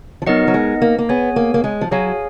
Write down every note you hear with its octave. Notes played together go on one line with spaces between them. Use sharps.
F3
F#3 B3 D#4 A#4 D#5 F#5
F#3
G#3
A#3
A#3
B3 G#4 C#5 G#5
A#3
A#3
G#3
F3
F#3 G#4 C#5 F5 G#5